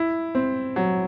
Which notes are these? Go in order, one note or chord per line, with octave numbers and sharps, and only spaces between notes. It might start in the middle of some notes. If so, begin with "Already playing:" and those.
Already playing: E4
C4
F#3